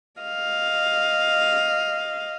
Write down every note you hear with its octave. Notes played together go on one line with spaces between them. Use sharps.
D#5 F5